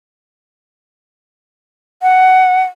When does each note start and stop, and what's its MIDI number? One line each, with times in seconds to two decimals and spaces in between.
2.02 2.63 78